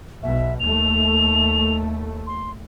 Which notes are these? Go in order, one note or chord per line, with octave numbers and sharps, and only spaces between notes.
B1 B2 E5
D#2 A3 F7
C6